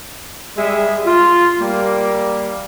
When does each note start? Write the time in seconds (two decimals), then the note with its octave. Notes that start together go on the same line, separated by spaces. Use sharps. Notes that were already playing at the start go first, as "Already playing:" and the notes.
0.57 G3 G#3 G#4 E5
1.05 F4
1.59 G3 A#3